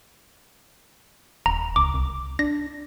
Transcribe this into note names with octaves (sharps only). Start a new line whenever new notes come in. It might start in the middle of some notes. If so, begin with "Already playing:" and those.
D#1 A#5
C#2 D6
C2
D4 A#6